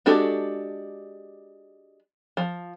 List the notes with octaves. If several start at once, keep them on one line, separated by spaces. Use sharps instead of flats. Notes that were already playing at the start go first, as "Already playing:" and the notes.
G#3 D4 F#4 G4 A4
F3